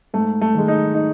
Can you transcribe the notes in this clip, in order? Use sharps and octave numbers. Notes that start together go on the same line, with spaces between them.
G#2 A3
A3
D#3 G#3
D#4
D#4